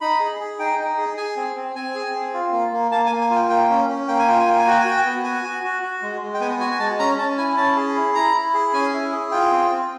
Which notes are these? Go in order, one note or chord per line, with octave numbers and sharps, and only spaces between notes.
D#4 B5
G#4
G#4
D#4 G5
D#4
G#4
G#4 G#5
C4
C4
C4 G#5
G#4
C4
F4
A#3
A#3
A#3 A5
G#5
A#3
G#5
F4
G5
A#3 G5
C#4
C#4
A#3 G5
G#5
F4 G5
G#5
A#3 G5
G#5
F#4 G5
G#5
F#4 G5
B3
F#4 G#5
F#4
F#4
F#4
G#3
G#3
G5
B3 G#5
F#4 G#5
G#5
G#3 A5
C#4 A#5
C#4 A5
E4 G#5
C#4 A5
G#4
E4
E4 A#5
E4
G#4
C#4 G#5
E4
G#4
F4 G5
C4
C4